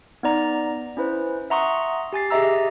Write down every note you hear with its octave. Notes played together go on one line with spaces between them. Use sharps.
B3 D#4 D5 A#5
C#4 E4 B4 C5
E5 F#5 A#5 C6 C#6 D#6
G4 G#5 A6 C7
G4 G#4 D#5 E5 A#5 E6